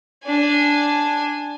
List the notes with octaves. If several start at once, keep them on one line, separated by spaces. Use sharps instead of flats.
D4 G#5